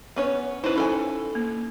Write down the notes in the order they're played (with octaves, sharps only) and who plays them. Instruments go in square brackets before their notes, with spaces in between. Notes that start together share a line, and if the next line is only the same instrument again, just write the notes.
[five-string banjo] B3 C#4 C#5
[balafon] C#4 D#4 E4 [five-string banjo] B4 C5
[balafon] D#4 [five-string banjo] E4 A4 G#5
[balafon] A#3